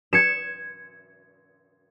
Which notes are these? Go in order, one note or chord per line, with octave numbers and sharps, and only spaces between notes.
G#6 C#7 E7